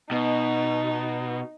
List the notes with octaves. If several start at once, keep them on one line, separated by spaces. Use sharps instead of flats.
B2 D#4